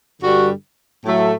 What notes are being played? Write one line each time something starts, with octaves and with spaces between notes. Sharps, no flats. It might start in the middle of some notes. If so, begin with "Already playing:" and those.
G2 D3 G3 F#4
A2 F#3 A3